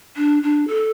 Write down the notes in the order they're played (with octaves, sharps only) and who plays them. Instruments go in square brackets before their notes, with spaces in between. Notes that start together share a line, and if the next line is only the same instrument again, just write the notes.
[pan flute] D4
D4
A4